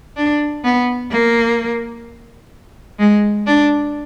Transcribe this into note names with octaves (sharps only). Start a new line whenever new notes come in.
D4
B3
A#3
G#3
D4